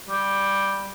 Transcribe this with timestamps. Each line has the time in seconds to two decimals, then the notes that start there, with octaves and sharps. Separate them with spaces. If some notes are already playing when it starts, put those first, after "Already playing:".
0.09 G3